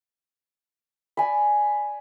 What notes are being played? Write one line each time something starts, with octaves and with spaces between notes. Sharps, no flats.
D5 G#5 B5